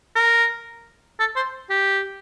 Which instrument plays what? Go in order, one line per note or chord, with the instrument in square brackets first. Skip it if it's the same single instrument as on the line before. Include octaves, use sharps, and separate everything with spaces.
[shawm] A#4
A4
C5
G4